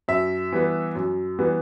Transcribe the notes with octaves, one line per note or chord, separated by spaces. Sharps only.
F#2 E5
E3 G3 B3
F#2
E3 G3 B3